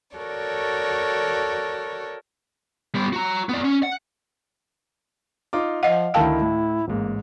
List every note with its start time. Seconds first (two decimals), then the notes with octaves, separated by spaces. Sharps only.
0.18 F#4 A4 A#4 C#5 D5
2.95 G3 B3
3.13 F#4 A#5
3.49 B3 D5
3.64 C#4
3.83 F#5
5.53 D#4 F4 D6
5.83 F3 D#5 F5 F#5
6.14 D2 D#3 E4 F5 G5 A5 E6
6.41 A2
6.88 A1 G#2 A#3